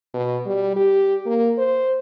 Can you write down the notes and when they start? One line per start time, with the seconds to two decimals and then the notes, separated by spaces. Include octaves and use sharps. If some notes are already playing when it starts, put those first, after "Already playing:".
0.14 B2
0.46 G3
0.76 G4
1.26 A#3
1.58 C5